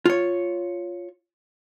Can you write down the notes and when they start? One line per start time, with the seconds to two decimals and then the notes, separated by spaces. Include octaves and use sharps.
0.06 F4 C#5